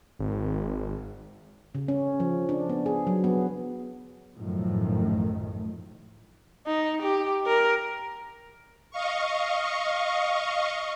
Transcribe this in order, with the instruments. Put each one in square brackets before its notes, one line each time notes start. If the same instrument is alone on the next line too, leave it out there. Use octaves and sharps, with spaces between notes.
[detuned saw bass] G#1
[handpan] C#3
C#4
F3
D4
B3
G#4
F#3
B3
[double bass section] B1 F#2 A2 D#3 F3 A3
[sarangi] D#4
G4
A#4
[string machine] D#5 F5 C#6